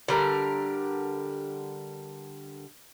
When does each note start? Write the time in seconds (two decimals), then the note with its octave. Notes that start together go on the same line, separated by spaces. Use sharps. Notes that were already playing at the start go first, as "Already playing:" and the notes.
0.08 D3 G3 A#4